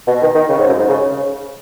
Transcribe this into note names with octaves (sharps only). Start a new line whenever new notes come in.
B2
D#3
D#3
C#3
G#2
F#2
G#2
C#3
C#3